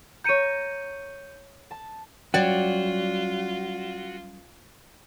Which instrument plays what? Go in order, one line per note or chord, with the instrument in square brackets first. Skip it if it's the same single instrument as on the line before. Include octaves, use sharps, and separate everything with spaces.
[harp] C#5 A#5 [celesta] G6 C#7 D#7
[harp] A5
[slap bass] F#3 G3 C#4 [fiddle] F4 [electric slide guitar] F#4 [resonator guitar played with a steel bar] C#5 D5 G5